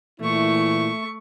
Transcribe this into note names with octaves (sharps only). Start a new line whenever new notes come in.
A#2 E3 A3 E4 C#6